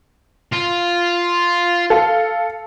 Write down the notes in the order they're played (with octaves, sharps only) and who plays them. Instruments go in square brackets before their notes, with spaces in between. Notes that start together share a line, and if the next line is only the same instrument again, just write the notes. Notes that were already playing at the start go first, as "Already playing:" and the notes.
[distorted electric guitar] F4
[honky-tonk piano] A4 F5